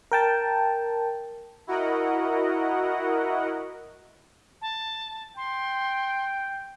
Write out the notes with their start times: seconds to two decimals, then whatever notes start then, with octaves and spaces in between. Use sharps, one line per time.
0.12 A#4 G5 A5
1.67 E4 F#4 A#4 D#5 F#5
4.62 A5
5.37 G5 C6